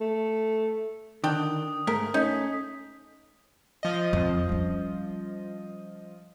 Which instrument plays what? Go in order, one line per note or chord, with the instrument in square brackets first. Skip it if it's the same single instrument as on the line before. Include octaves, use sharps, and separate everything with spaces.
[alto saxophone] A3
[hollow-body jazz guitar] D3 D#3 [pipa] D4 G5 [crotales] D#6
[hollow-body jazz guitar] G#2 A3 [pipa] A#4 [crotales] B6
[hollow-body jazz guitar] A3 C#4 [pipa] D#4
[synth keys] F3 D#5
[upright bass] F2
G3 C#4